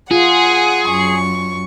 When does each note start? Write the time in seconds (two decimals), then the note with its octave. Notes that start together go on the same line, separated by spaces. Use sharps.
0.11 F4 G#4 F#5
0.85 F#2 C#6